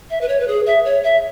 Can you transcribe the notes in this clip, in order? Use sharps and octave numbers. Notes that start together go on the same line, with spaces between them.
E5
B4
C#5
B4
G#4
E5
C#5
E5